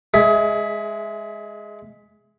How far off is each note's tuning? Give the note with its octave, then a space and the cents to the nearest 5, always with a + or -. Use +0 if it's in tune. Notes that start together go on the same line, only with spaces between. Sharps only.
G#3 +0 G#4 +30 E5 +0